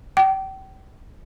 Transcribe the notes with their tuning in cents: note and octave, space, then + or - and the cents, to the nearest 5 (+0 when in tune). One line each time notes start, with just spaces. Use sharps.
G5 -35 D6 +0